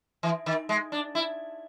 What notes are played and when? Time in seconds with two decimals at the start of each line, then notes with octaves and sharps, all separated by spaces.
0.23 E3
0.46 D#3
0.69 G#3
0.92 D4
1.15 E4